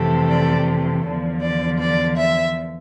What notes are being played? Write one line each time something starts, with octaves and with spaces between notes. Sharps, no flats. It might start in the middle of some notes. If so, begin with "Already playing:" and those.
Already playing: F2 C3 E3 A3
D5
E2 D3 F3
D5
D5
E5